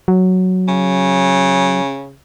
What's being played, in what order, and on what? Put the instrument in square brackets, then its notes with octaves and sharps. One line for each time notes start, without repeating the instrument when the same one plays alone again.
[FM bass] F#3
[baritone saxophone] C#3